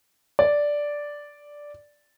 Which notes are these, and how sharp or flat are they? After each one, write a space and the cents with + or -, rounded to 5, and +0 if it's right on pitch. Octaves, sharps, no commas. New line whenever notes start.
D5 -5